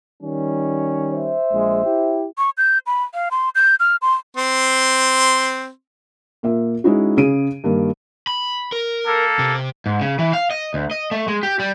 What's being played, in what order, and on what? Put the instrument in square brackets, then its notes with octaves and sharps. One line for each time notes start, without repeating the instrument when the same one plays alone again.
[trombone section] D#3 G3 C#4
[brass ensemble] C5 E5
[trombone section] A#1 G#3
E4 G4
[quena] C#6
G6
B5
F5
C6
G6
F6
C6
[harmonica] C4 C6
[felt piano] A#2 A#3 E5
G#3 C#4 D#4 E4 F#4
C#3 C#4 G#4 D7 D#7
G2 D#3 A#3
[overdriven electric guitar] B5
A#4
[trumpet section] A#3 A4
[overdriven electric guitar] C3
G#2
C#3
E3
F5
D#5
D2
D#5
A3
G#3
G4
G3